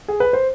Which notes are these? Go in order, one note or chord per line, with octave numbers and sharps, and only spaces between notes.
G#4
B4
C5